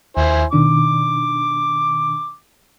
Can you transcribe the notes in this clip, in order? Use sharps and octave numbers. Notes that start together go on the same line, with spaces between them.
D#2 E4 C5 G#5
B2 D#3 D4 D6